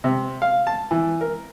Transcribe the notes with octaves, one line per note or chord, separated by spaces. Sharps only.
C3
F5
A5
E3
A#4